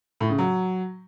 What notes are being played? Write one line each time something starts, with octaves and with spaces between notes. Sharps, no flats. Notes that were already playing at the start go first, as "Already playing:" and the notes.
A2
C#3
F#3